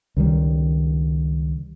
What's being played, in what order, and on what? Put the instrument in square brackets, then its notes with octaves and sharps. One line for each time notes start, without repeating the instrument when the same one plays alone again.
[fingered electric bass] C#2 D#3 G3